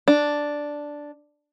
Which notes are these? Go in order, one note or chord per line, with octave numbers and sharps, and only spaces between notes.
D4